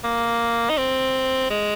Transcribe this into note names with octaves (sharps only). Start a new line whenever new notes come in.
A#3
D#4
C4
G#3